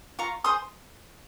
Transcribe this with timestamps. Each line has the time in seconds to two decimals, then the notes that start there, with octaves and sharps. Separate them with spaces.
0.19 F4 A#5 C#6
0.44 G#4 C5 C6 D#6